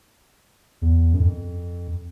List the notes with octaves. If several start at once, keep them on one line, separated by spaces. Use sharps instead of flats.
E2
F#2
F2